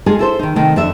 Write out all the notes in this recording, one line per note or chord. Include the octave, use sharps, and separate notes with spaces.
G#3 F4 G#4 A4 G#5
E4 A4 C5
D#3 D#4
C3 D#3 A3
F2 D3 A4 E5